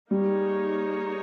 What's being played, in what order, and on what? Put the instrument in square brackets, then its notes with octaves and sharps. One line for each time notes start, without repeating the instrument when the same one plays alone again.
[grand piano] G3 [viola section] A#3 D#4 G#4 C#5